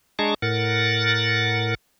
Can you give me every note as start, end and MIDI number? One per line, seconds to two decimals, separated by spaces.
0.19 0.34 56
0.19 0.34 62
0.19 0.34 68
0.19 0.34 81
0.19 0.34 82
0.19 0.34 85
0.42 1.75 45
0.42 1.75 70
0.42 1.75 78
0.42 1.75 93